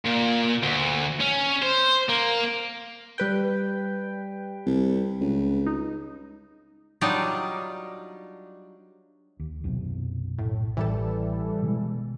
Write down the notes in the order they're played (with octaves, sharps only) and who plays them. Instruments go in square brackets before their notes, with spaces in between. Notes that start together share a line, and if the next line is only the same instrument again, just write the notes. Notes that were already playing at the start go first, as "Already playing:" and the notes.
[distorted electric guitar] A#2
D2
C#4
C5
A#3
[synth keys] G3 B4 G5
[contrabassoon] C2
C#2
[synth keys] D#4
[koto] F#3 G3 D4 D#4 F4 D5
[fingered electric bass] D#2
B1 F#2 C3
[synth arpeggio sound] A2
[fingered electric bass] A1 [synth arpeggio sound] E3 G3 A4
[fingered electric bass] B2 D#3 G#3